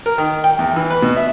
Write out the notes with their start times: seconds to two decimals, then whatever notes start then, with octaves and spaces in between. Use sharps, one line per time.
0.06 A#4
0.18 D#3
0.44 G5
0.59 E2
0.76 E3
0.90 B4
1.02 B2
1.16 E5